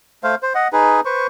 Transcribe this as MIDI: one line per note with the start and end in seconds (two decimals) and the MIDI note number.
0.24 0.35 57
0.24 0.35 72
0.24 0.35 77
0.43 0.53 72
0.55 0.68 75
0.55 0.68 78
0.73 1.01 63
0.73 1.01 68
0.73 1.01 71
1.05 1.27 71
1.05 1.27 72
1.05 1.27 85